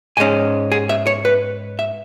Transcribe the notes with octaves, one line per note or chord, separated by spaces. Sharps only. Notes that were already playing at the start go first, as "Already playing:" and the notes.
G#2 G#3 C#4 G#5
G#4
E5
C#5
B4
E5